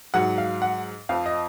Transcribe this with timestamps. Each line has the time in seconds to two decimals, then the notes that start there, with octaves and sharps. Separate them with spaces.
0.14 G#2 F#3 F#5
0.38 F5
0.62 F#5
1.09 F2 F3 F5
1.26 D#5